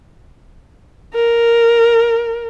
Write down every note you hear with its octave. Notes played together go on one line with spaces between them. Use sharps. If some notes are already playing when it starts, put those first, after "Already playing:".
A#4